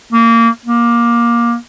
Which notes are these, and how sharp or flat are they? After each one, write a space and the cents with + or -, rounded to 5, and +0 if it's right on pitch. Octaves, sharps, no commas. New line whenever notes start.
A#3 -20
A#3 +15